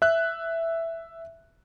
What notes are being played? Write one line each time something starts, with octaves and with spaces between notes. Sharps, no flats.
E5 F#6